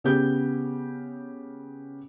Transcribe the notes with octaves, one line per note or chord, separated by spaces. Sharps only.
C#3 B3 G4 G6